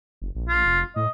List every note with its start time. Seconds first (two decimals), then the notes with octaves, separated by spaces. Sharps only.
0.22 F#1
0.35 A#1
0.49 F4
0.65 F1
0.96 A2 D#5